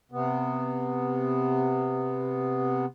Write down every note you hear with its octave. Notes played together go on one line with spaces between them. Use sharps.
C3 B3